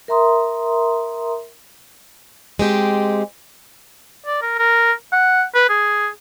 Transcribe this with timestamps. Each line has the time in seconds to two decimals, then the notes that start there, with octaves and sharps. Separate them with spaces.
0.08 A#4 E5 A#5 C6 D#6
2.59 G#3 C4 G4
4.26 D5
4.42 A#4
4.58 A#4
5.12 F#5
5.55 B4
5.69 G#4